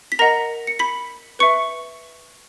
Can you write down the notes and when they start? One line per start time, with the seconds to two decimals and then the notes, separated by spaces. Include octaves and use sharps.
0.12 B6
0.19 A#4 D#5 F#5 A#5 A#6
0.67 C#7
0.79 B5 B6
1.39 B4 E5 C#6 C#7